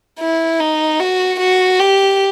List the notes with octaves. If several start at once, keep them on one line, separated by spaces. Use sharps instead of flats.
E4
D#4
F#4
F#4
G4